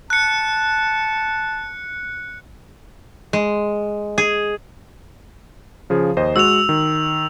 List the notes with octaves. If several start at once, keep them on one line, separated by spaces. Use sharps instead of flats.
A5 F#6 C#7
G#3
G#4
C#3 F3 G#4
D#2 C5 D#5
G#3 F#4 E6 F7
D#3